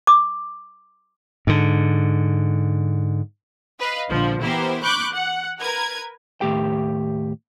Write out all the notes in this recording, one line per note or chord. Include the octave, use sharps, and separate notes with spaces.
D6
G#2 D3
B4 D#5 F5
A#1 D3 F3
E3 B3 E4 G4 A#4 C5
B5 C#6 D6 F#6 G6
F#5
A#4 B4 G#6
D#2 A2 G4 G5